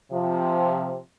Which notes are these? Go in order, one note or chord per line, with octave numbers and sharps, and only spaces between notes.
C3 F3